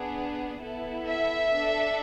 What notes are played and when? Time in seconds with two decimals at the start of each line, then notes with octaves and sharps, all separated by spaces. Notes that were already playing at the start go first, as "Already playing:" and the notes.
Already playing: B3 D4 G#4
0.62 B3 E4 A4
1.08 E5
1.53 D4 A4